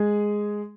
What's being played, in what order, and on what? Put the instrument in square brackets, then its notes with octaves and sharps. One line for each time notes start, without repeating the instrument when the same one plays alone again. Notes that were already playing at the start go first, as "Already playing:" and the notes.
Already playing: [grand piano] G#3 G#4